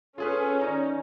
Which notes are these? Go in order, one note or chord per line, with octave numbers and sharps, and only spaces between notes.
C#4 F4 G#4 A4 B4
D#3 D#4 D5 A#5